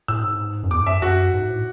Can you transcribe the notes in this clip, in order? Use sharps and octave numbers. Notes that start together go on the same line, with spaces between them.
A2 E6
G#2
F#2
E2 D6
G#2
F#2 E5
F#2 F#4
G#2
A2